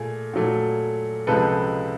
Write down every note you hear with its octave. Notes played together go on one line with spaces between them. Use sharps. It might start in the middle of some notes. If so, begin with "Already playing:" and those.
Already playing: A#2 A3 G#4
A#2 F#3 A3
C#2 C3 F3 G#3 A4 B4